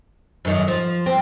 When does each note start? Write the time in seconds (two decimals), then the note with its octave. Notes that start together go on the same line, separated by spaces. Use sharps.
0.45 F#2 D#3
0.68 F3
1.06 C4